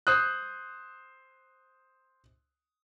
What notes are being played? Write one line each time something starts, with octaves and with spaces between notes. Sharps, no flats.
C5 D#6 F#6